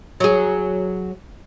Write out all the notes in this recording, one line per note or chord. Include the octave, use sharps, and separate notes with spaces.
F#3 G#4